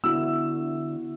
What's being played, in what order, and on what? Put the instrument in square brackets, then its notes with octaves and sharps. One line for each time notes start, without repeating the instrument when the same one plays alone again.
[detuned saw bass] D3 [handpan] B3 E4 F#4 [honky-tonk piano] E6